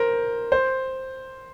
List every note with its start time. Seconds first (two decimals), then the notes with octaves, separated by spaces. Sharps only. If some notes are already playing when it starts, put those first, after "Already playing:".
Already playing: A#4 C5
0.52 C5